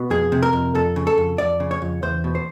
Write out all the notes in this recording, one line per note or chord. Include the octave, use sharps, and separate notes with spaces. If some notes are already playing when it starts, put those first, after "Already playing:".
Already playing: B2
F2 G#4
C3
A#4
F2
F2 A4
C#3
A4
F2
F2 D5
C#3
C#5
F2
E2 C5
B2
C5